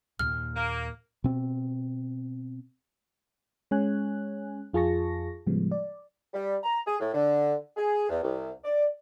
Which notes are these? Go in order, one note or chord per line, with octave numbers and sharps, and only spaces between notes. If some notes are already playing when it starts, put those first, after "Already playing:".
D#2 A#2 F6
A#3
B2 C4
G#3 C#4 C#5 G#5 F#6
F2 F4 G#4 A5 C#6 A#6
A2 C#3 F3 G3 G#3 B3
D5
G3
A#5
G#4
A2
D3
G#4
E2
C2
D5